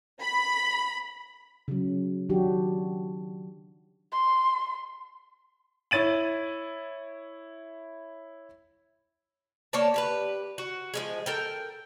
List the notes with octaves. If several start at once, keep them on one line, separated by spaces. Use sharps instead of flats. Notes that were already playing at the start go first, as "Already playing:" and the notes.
B5
C#3 F#3
D#3 F#3 D4 F#4 G4
C6
E4 C#5 A6 D#7 F#7
A#3 C#5 D5 A5
G4 G#4 B4
F#4
F3 G#3 G#4
A4 A#4 G5